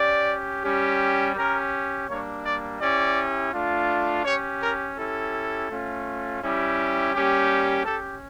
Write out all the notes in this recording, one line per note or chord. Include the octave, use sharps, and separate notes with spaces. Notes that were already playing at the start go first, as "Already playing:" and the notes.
Already playing: C#4 G4 D5
G3 C#4 G4
C#4 G4 A#4
G3 A#3 D4 C#5
D5
C#4 E4 G4 D5
A3 D4 F4
C#4 G4 C#5
A#4
C#4 E4 G4 A4
A3 C#4 F4
G3 C#4 E4 G4
G3 A#3 C#4 G4
C#4 G4 A4